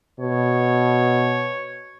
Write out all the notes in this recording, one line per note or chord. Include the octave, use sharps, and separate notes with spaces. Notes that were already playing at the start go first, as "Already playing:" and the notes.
B2 C#5